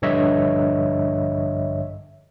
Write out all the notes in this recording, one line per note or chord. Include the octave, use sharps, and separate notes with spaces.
A#1 G2 D3 C#5 D#5 E5